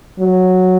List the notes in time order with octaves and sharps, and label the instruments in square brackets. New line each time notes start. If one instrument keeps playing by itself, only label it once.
[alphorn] F#3